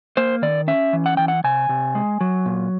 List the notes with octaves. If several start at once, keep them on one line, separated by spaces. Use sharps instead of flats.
A#3 C5
D#3 D5
C#4 E5
E3
F#5
E3 G5
F#5
C3 G#5
C3
G#3
F#3
A#2